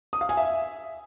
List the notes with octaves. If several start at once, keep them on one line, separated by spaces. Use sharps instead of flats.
D#6
F5
G#5
E5